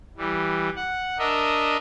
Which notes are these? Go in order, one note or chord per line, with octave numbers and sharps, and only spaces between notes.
E3 G3
F#5
D4 A#4 D#5 E5